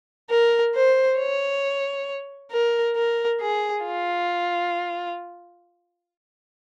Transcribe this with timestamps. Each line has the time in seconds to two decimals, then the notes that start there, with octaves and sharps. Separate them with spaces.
0.30 A#4
0.75 C5
1.18 C#5
2.52 A#4
2.96 A#4
3.41 G#4
3.85 F4